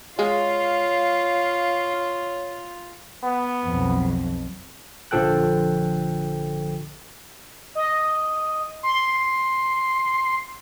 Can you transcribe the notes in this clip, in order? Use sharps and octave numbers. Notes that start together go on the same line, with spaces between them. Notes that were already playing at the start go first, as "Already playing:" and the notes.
G#3 F4 C#5 F5
B3
B1 F2
A#1 D3 F3 A4 G5 F#6
D#5
C6